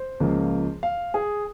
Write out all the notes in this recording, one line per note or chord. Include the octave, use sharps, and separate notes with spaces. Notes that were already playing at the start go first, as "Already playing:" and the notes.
Already playing: C5
C#2 C#3 F3 A#3
F5
G#4